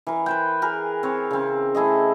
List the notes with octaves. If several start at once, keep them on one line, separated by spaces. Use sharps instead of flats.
E3 A#4
B4 C5 G5
G#4 A#4 B4
C4 C#5
C#3 C4
A3 E4 G#4 D#5